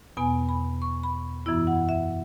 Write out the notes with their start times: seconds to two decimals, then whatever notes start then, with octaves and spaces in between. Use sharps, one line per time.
0.17 E2 B2 B3 G#5
0.49 B5
0.82 C#6
1.03 B5
1.46 F#2 E3 B3 E4 E6
1.67 F#5
1.89 E5